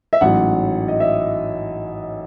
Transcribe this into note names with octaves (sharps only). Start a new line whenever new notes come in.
E5
A1 G#2 F#3 F#5
D#5
E5